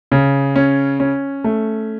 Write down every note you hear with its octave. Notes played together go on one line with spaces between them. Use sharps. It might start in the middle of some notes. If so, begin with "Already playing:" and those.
C#3
C#4
C#4
A3